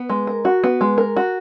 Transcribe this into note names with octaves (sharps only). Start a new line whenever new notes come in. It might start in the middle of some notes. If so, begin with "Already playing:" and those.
Already playing: B3
G#3
A#4
F#4
B3
G#3
A#4
F#4